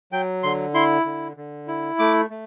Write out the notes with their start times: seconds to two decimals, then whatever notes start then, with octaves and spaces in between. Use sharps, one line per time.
0.12 F#3 G5
0.43 D3 C6
0.74 E4 C6
1.06 D3
1.37 D3
1.67 E4
1.99 A3 D6
2.30 A3